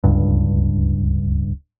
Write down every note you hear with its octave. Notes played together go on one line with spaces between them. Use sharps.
D1 C#2 G2